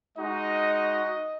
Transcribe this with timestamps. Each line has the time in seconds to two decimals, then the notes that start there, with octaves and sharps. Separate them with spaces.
0.18 G#3 D#4 F#4 D#5